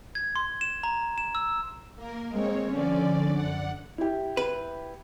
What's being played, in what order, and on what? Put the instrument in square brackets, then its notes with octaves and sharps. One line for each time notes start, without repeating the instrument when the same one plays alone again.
[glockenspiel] G#6
C6
E7
A#5
E7
E6
[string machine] A#3 A#4
[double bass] G#3 [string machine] C4 C#5
[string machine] D3 D5 [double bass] F3 C#4
[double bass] F#2 [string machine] F#5
[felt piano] E4 G4
[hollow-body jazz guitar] B4